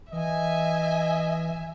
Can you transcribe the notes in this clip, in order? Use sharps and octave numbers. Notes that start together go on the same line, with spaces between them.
E3 D#5 E5 G#5